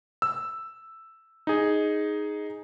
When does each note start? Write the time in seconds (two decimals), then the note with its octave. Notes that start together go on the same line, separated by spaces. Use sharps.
0.22 E6
1.47 D#4 G#4